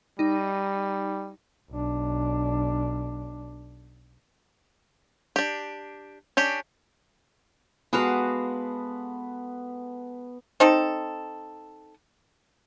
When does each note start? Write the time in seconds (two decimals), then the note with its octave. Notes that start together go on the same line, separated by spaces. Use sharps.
0.19 G3 D#4
1.71 B1 D4
5.36 D4 G4
6.37 C#4 D4 G4
7.93 G#3 B3 F#4 A4 B4 F5
10.60 C4 D#4 A4